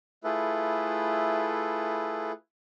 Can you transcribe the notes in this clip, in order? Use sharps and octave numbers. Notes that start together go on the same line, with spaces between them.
A3 E4 F4 G#4 A4 B4